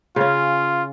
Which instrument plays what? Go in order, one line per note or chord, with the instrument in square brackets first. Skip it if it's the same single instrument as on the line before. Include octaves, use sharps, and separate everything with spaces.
[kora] C#3 C#4 [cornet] F4